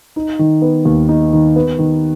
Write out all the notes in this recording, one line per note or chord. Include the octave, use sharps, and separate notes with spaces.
D#4
D#3
B3
D#2
D#4
D#3
B3
D#3